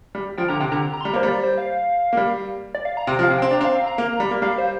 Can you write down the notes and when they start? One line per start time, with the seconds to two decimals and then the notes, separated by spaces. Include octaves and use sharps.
0.15 G3
0.38 F3 G5
0.49 D3 A#5
0.60 C3 G5
0.72 D3 A#5
0.93 A#5
1.01 C6
1.05 G3 A#5
1.14 A#3 C5
1.23 G3
1.28 D5
1.43 C5
1.58 F5
2.13 A#3
2.17 G3
2.75 D5
2.85 F5
2.97 A#5
3.07 C3 G5
3.19 F3
3.23 F5
3.30 C3
3.38 C4 G5
3.51 D4 A#5
3.61 C4 F5
3.76 F5
3.86 A#5
3.98 A#3
4.20 G3
4.31 A#3
4.42 G3 F5
4.58 C5